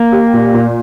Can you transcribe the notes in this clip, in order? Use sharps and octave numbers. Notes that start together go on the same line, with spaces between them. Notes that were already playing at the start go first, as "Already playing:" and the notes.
Already playing: A#3
G4
A#2
A#2